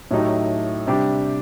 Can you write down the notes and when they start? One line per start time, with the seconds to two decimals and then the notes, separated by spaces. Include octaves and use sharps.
0.11 A2 F#3 A3 D#4 G4
0.87 C3 G3 D4 G4